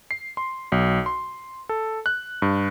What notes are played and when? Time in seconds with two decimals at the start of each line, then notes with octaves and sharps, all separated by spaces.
0.11 C7
0.37 C6
0.72 B1
1.06 C6
1.69 A4
2.06 F#6
2.42 G2